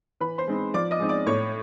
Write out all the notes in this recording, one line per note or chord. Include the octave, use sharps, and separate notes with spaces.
E3 B4 B5
C5 C6
G#3 C4 D#4
F3 D5 D6
D#5 D#6
G#3 C4 D#4
D5 D6
A2 C#5 C#6